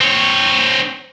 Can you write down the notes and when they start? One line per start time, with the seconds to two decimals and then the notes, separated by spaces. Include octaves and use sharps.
0.01 C4 C#5